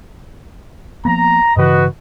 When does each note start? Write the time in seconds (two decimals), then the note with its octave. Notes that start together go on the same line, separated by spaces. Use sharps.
1.05 F3 A#3 B3 A#5
1.56 G2 C#3 E3 F#4 B4 D#5